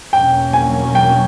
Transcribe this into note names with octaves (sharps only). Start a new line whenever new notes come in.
E2 B2 F#3 A#3 C#4 G5
G#5
G5